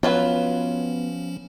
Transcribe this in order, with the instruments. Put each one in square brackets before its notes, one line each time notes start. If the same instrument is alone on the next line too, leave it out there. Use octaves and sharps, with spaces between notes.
[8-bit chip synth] F3 C#4 [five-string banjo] F#3 F4 B4 [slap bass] B3